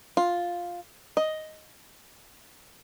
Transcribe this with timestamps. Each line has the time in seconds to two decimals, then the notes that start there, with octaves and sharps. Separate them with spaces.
0.17 F4
1.17 D#5